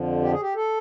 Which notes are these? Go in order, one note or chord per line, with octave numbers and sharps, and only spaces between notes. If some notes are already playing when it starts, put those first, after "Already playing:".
Already playing: F2 D3 F3
G4
G#4
G4
A4